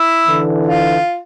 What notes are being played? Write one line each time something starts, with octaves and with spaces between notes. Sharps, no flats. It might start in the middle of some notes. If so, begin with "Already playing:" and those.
Already playing: E4
D3 E3
F4